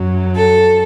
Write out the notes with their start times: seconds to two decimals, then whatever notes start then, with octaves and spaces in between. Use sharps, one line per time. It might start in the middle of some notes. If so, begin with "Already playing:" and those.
Already playing: F#2 F#3
0.36 A4